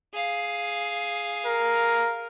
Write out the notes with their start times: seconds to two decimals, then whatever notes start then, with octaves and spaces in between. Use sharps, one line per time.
0.13 G#4 F5
1.47 A#4